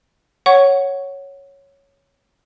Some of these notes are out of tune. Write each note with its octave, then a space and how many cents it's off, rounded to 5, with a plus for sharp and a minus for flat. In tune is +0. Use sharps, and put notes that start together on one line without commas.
C#5 +0 F#5 +0 C#6 +0